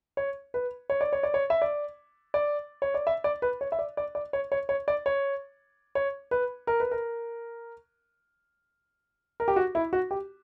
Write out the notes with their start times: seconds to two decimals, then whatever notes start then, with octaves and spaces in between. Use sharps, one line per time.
0.17 C#5
0.54 B4
0.90 C#5
1.01 D5
1.13 C#5
1.23 D5
1.34 C#5
1.50 E5
1.62 D5
2.34 D5
2.82 C#5
2.94 D5
3.07 E5
3.24 D5
3.42 B4
3.61 C#5
3.72 E5
3.79 D5
3.97 D5
4.15 D5
4.33 C#5
4.52 C#5
4.69 C#5
4.88 D5
5.06 C#5
5.95 C#5
6.31 B4
6.67 A#4
6.80 B4
6.91 A#4
9.40 A#4
9.48 G4
9.56 F#4
9.75 E4
9.93 F#4
10.11 G4